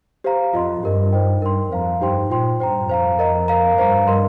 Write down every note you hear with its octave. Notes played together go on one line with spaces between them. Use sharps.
G4 C5 F5 A#5
F2 F4 D#5 C6
G2 G4 A#4 D#5
D#4 C5 D#5 G5
G2 A#4 G5 C6
F2 C5 F5 A#5
G2 D#4 G4 C5 G5 C6
A#2 F4 C5 G5 C6
G2 C5 G5 A#5
F2 C5 F5 A#5
A#4 D#5 A#5
A#4 F5 A#5
G2 C5 F5 A#5
A#4 D#5 C6